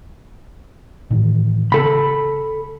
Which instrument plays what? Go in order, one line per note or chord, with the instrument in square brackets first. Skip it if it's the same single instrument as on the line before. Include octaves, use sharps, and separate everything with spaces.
[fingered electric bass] A2 D#3 E3
[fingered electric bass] C#3 [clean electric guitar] A4 B5